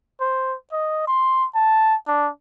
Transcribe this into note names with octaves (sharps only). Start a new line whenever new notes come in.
C5
D#5
C6
A5
D4